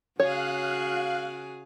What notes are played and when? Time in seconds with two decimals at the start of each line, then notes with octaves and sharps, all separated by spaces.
0.20 C#3 F#4 G#4 C#5 F5 F#6